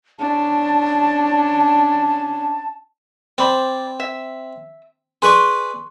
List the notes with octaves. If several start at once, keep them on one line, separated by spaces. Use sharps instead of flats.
C#4 D4 A5
C4 C5 D5 B5
E5
G#4 B4 D5 C6 C#6